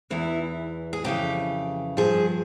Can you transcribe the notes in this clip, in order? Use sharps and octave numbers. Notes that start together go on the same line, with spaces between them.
E2 E3 E4
G#4
F2 C#3 E3 G4
G2 F3 G#4